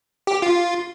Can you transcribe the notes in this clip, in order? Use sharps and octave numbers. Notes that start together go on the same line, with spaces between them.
G4
F4